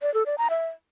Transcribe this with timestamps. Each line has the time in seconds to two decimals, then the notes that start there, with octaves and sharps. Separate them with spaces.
0.02 D5
0.14 A4
0.26 D5
0.38 A#5
0.50 E5